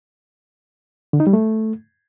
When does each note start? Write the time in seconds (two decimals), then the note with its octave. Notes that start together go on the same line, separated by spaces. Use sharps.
1.13 D3
1.20 D#4
1.27 G3
1.33 A3